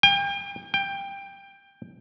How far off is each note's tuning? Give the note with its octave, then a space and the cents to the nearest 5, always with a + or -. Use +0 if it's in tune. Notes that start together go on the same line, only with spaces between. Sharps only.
G5 +35
G5 +15